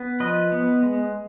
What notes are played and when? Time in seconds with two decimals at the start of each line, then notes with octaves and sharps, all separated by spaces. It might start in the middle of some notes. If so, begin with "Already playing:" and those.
Already playing: B3
0.20 F3 B4 D#5
0.52 B3
0.83 G#3